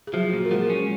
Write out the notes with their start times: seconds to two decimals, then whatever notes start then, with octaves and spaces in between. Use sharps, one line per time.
0.07 G#4
0.13 F3 F#3 F#4
0.33 A#2
0.45 A#4
0.51 F3 G#3 G#4
0.70 C#4